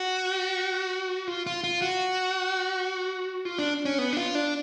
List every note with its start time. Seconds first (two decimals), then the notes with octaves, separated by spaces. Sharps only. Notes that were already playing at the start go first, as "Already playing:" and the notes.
Already playing: F#4
1.27 F4
1.47 F4
1.64 F4
1.82 F#4
3.45 F4
3.59 D4
3.85 C#4
3.98 B3
4.13 D4
4.17 F4
4.35 D4